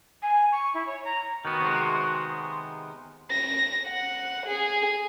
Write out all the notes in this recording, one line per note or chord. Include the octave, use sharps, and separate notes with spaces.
G#5
C#6
E4
C#5
A#5
D#3 B3 F#4
C3 G#3
A#6
F#5
G#4